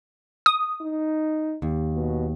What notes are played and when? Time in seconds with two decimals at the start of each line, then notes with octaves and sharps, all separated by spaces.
0.46 D#6
0.81 D#4
1.62 D#2
1.95 B2